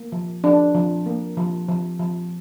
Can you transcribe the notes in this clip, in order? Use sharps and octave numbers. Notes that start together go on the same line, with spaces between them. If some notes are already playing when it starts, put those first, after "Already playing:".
Already playing: A#3
F3
F3 D4
F3
A#3
F3
F3
F3